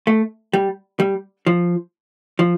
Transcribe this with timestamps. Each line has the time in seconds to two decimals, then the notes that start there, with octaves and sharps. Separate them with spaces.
0.07 A3
0.53 G3
1.00 G3
1.47 F3
2.39 F3